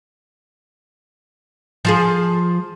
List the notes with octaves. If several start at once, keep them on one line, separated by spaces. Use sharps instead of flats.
F3 F4 G#4